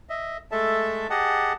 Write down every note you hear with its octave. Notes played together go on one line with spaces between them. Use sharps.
D#5 E5
G#3 A3 A4 E5 A5
G4 G#4 D#5 F#5 A5